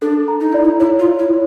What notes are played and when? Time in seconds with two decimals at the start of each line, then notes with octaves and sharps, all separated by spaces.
0.02 D4 A4
0.28 A#5
0.40 D#4
0.52 E4 D5
0.64 D#4
0.80 E4 C#5
0.99 F4
1.05 C#5
1.19 E4
1.31 C#5